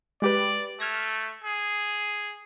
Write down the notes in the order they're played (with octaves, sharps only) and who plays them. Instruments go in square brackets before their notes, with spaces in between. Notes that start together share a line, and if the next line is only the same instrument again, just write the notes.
[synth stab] G#3 G4 B4 [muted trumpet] D5
[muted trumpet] A3 [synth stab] F6 G#6 A#6
[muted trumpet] G#4